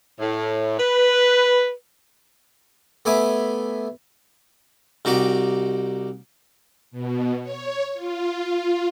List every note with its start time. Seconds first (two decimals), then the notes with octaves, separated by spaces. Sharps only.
0.20 A2
0.79 B4
3.05 A3 B3 E5 G#5 D6
5.05 C2 D#4 F#4 G4 D6
6.91 B2
7.42 C#5
7.94 F4